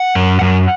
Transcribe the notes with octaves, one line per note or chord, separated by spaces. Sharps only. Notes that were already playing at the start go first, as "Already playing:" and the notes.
Already playing: F#5
F#2
F#2